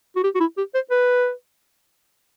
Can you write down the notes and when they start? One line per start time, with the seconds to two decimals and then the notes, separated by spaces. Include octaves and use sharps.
0.16 F#4
0.24 G4
0.35 F#4
0.40 E4
0.57 G4
0.74 C5
0.90 B4